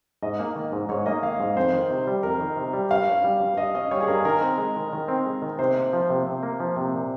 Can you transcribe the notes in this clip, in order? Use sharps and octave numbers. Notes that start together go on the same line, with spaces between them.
G#2 D#5
A#3
D#3
G#2
G#2 C#5
A#3 D#5
D#3 F5
G#2
F2 C5
D#3
C3
G3
F2 A#4
D#3
C3
G3
G2 F5
C#4
G3
G2
G2 D#5
C#4 D#5
G3 C#5
G#4
G2 A#4
D#3 A#4
C4
G#3
D#3
D#3
C4
G#3
D#3
C3 C5
A#3
F3
C3
C3
A#3
F3
C3
A#2